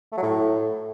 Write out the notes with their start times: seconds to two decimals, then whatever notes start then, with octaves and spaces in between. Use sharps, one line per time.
0.12 A3
0.17 F#3
0.22 A2